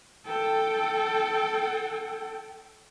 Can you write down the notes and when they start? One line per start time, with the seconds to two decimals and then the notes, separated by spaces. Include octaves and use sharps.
0.26 A4 G5